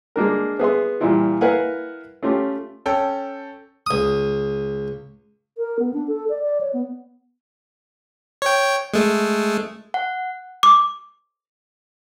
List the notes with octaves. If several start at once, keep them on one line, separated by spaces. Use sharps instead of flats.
G#3 A#3 D4 A#4
B3 G#4 E5 C6
A#2 E3 G3 E4 F4
E4 A#4 B4 F5 F#5 G#5
A3 C#4 F4 G4
C#4 A4 G5
C#2 D#6
A#4
B3
D4
A4
D5
D5
C#5
B3
C#5 G5
G#3 A3
F#5
D6